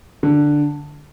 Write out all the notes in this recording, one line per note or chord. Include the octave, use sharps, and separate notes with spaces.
D3